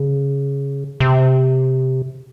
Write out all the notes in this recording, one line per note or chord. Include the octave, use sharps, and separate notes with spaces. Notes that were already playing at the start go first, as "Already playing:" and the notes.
Already playing: C#3
C3